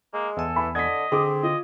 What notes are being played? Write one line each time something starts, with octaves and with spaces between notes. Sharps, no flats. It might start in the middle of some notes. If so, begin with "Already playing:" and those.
G#3 A#3
E2 A4 G#5
E3 B5
D3 D#5 G#6 B6
D3 C4 G#4 D6 D#6
F4 D#5